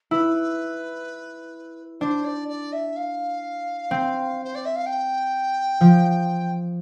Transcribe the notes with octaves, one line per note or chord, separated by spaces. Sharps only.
E4 B4
D4 C5
D5
D5
E5
F5
C4
C5
D5
E5
F5
G5
F3